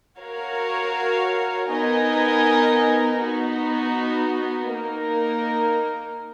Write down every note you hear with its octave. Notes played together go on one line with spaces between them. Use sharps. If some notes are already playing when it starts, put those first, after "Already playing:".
F#4 A#4 C#5 F5
B3 D#4 A#4 D#5 G#5
B3 D#4 F#4
A#3 D#4 A#4